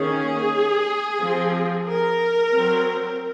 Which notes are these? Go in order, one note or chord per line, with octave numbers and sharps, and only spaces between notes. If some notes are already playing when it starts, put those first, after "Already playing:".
Already playing: D#3 A#3 C#4 G#4
F3 C4
A#4
F#3 C4